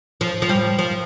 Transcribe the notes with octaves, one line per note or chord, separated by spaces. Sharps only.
F3
F3
G3
F3